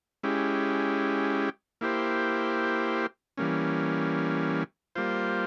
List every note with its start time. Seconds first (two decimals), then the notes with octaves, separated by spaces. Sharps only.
0.23 G#3 C#4 E4 G4
1.81 A#3 E4 G4 C5
3.37 E3 G3 A#3 C#4
4.95 G3 A#3 F4 C5